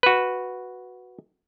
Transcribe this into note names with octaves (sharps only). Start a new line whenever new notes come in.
F#4 B4